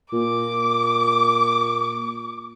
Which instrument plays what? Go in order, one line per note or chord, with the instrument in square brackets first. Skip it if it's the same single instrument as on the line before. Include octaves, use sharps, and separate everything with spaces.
[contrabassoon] A#2 [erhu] D6